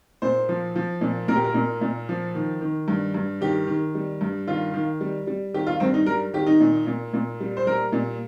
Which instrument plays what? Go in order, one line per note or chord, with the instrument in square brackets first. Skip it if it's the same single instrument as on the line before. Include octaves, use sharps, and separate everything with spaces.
[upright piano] A#2 C5
F3
F3
A#2
A#2 A#4
G4
A#4
A#2
A#2
F3
D#3
D#3
G2
G2
D#3 G4
D#3
G3
G2
D#3 F4
D#3
G3
G3
D#3 G4
F4
G2 C4
D#4
G3 A#4
D#3 G4
D#4
A#2
A#2
A#2
G3
C5
G3 A#4
A#2